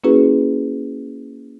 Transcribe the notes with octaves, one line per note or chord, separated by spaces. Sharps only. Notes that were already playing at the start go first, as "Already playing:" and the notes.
A#3 C#4 E4 F#4 G#4 B4